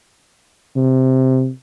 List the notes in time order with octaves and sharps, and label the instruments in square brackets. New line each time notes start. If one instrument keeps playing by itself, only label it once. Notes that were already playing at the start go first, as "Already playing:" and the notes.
[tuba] C3